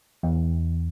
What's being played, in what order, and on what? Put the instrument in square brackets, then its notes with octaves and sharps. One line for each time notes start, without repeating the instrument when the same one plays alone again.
[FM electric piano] E2